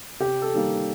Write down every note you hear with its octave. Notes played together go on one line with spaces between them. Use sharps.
C3 G4
A4
D#3 G3 A#3